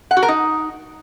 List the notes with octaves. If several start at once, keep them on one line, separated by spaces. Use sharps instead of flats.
F#5
F#4
A#4
D#4